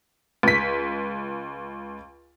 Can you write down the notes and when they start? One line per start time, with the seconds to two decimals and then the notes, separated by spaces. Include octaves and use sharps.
0.43 C#2 B6